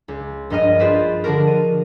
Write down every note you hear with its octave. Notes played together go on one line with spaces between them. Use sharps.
C#2
A#1 G2 D#5 A#5 F6 D#7
F4 G#4 B4 C5 D5
D3 F3 D4 F#4 A#4
D#7